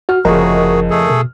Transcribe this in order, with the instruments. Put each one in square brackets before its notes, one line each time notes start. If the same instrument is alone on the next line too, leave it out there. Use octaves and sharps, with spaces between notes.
[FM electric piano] F#4 [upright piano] F6
[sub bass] F1 [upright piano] F2 C#3 [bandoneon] A3 F#4 G#4 [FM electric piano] A#4 D#5
[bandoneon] A3 G#4 A4
[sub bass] B2